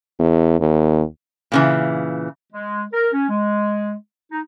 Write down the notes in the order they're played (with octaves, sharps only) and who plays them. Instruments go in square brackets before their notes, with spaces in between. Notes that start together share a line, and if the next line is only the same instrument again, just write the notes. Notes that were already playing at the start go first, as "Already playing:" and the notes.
[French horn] E2
D#2
[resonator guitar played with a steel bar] A#2 C#3 E3
[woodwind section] G#3
A#4
C#4
G#3
D#4